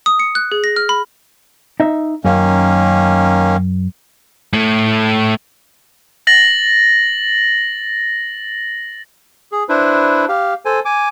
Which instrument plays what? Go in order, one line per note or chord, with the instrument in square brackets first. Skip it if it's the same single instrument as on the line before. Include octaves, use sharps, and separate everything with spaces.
[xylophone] D#6
C#7
F#6
G#4
A#6
F6
B5
[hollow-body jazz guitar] D#4 E5
[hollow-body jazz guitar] F#2 F5 [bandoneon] D#3 A#3 C#4
[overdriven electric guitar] A2 A3
[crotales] A6 A#6 F#7
[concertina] G#4
D4 E4 B4 C5
G4 F5
A4 C5 G#5
G#5 D6